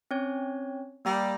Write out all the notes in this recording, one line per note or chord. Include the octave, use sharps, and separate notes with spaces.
C4 C#4 C#5
G3 A#3 A#5 A#6